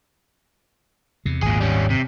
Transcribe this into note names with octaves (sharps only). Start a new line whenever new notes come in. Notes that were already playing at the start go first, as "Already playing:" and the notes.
E2 C3
G#1 D#2 A#2 G#4
G3 C#4
C3